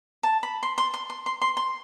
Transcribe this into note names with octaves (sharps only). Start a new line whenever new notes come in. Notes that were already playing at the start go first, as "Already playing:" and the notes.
A5
B5
C6
C6
C6
C6
C6
C6
C6